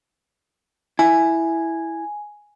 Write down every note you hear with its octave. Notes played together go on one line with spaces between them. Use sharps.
E4 G#5